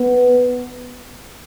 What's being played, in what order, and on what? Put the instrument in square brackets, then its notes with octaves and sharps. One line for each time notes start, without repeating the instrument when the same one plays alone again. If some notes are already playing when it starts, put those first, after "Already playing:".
Already playing: [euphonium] B3